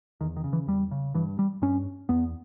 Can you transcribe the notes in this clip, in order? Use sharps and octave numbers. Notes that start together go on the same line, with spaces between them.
E2 D#3
D#3
C#3
E3
E2 G3
C#3
G2 E3
G3
G2 C#4
E2 B3